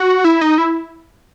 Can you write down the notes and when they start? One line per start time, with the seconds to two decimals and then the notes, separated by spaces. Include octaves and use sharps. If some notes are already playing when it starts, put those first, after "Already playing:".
Already playing: F#4
0.24 E4
0.41 D#4
0.58 E4